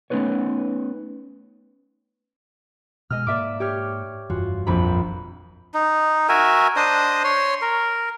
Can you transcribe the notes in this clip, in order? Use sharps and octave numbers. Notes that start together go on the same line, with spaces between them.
A3 B3 C#4 D#4 B4 C#5
B2 G#3 D#5 E6 F6
G#2 A#3 D5 E5 D6
G4 C#5 F6
F1 G2 E3 F4 F#4
A#1 F2 B5
D#4
F#4 A#4 E5 G#5
D4 C5 D#5 D#6
C#5 C6
A#4